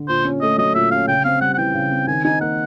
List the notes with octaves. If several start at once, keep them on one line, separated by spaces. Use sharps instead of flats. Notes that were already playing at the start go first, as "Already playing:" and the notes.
Already playing: D3
A#2 C5
C#4
A3 D#5
F#3 D#5
A#2 E5
C#4 F5
C#3 G5
C4 F5
G3 F#5
F#5
E3 G5
C#3
C4
D#3 G#5
D#4 G#5
A#3 F#5